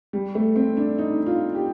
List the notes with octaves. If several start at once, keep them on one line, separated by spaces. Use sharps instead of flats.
G3
A3
C4
D4
D#4
F4
G4